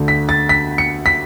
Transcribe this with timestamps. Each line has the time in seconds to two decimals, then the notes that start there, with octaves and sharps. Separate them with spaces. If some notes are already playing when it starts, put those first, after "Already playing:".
Already playing: D2 D3 A3
0.08 B6
0.29 A6
0.49 B6
0.78 C#7
1.06 B6